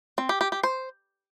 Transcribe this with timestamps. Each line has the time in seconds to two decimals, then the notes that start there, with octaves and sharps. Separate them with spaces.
0.18 C4
0.29 G4
0.41 G4
0.52 G4
0.63 C5